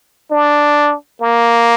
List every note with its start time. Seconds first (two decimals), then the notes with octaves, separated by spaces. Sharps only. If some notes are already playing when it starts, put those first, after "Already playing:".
0.31 D4
1.21 A#3